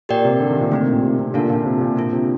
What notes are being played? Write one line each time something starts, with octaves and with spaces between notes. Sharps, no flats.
A#2 G4 A#4 D5 G5
C3
D3
D#3
A#2 D3
A#2 D3 A3 C4 D#4
C3
A#2
C3
C3
A#2 D3 D4 F4 A#4 F5 A5
A#2
C3
A#2
A#3 D4 F4
C3